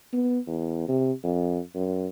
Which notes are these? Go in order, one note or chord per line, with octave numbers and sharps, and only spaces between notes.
B3
E2
C3
F2
F#2